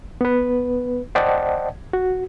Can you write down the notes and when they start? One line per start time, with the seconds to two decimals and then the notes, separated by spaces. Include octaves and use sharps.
0.21 B3 B4
1.15 C5 D5 D#5 F#5 G5 A5
1.93 F#4